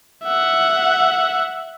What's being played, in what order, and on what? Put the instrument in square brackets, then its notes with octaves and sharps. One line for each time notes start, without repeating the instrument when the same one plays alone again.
[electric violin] E5 F#5